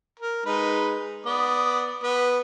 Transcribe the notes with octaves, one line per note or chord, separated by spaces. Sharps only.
A#4
G#3 D#4 B4
B3 D5 D#6
B3 B4